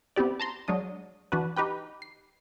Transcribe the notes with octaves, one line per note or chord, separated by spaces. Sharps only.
B3 C4 E4 G4 D5
A5 A#5 C6
F#3 G#3 D4 D#6
E3 D4 F#4 B4
D#4 G4 B4 G5
C7